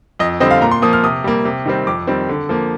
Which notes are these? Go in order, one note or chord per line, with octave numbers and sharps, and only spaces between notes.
F2 D#5
D3 G3 C4 D#5
F5
A#2 A#5
C6
F3 A#3 D#6
F6
C3 D#6
G3 A#3
C3
D#3 G3 C4
F2 D6
D#3 G3 C4
D3
F3 A#3